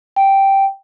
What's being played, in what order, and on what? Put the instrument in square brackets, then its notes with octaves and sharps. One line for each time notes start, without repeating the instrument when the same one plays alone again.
[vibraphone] G5